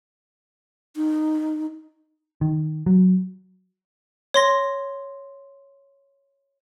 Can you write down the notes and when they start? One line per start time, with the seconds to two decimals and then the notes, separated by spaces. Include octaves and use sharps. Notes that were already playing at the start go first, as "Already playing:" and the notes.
0.96 D#4
2.41 D#3
2.86 F#3
4.34 C#5 C6 A#6